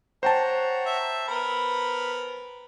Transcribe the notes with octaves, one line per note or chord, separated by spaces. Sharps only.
C5 C#5 F#5 G5 A5 A#5
E5
B3 A#4 B5